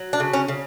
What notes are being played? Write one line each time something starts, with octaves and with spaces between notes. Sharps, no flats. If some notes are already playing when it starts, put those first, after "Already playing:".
Already playing: F#3
D4
C#3
C#4
C#3